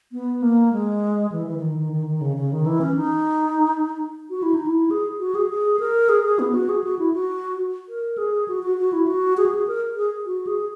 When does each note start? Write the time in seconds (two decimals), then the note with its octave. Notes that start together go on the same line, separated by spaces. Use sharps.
0.12 B3
0.42 A#3
0.73 G#3
1.32 E3
1.47 E3
1.58 E3
1.62 D#3
1.77 D#3
1.92 D#3
2.07 D#3
2.21 C#3
2.36 C#3
2.52 D#3
2.66 E3
2.81 C#4
2.96 D#4
4.30 F#4
4.43 E4
4.54 D#4
4.66 E4
4.91 G#4
5.20 F#4
5.35 G#4
5.50 G#4
5.80 A#4
6.09 G#4
6.24 G#4
6.39 B3
6.54 F#4
6.69 G#4
6.84 F#4
6.99 E4
7.13 F#4
7.89 A#4
8.18 G#4
8.48 F#4
8.63 F#4
8.78 F#4
8.93 E4
9.07 F#4
9.37 G#4
9.46 F#4
9.55 G#4
9.68 A#4
9.96 G#4
10.26 F#4
10.47 G#4